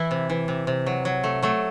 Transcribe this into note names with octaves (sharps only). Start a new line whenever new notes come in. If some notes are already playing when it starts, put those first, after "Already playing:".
Already playing: E3 E4
C3
E3
C3
C3
F#3
F#3
A3
F#3 A3